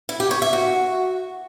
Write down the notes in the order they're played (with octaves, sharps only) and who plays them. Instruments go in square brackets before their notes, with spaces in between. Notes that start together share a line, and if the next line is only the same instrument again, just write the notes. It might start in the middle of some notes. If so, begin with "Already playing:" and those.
[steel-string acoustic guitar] E4
G4
C#5
E5
F#4